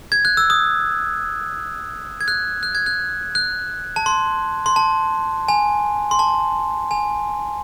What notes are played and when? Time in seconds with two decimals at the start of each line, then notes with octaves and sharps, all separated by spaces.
0.12 G#6
0.25 F#6
0.37 E6
0.50 D#6
2.21 G#6
2.28 F#6
2.63 F#6
2.75 G#6
2.86 F#6
3.35 F#6
3.96 A5
4.06 C6
4.66 C6
4.76 A5
5.48 G#5
6.11 C6
6.19 A5
6.91 G#5